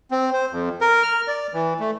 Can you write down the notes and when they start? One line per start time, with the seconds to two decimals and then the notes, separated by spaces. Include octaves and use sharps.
0.11 C4
0.33 C5
0.51 F2
0.81 A#4
1.03 F6
1.28 D5
1.53 E3
1.80 A3